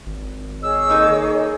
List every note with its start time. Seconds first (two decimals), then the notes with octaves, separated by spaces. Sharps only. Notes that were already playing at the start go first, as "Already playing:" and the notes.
0.06 G#1
0.62 G#4 C#5 D#5 E6
0.89 A#3 D#4 A4